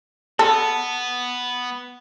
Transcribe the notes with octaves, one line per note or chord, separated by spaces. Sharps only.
B3 A4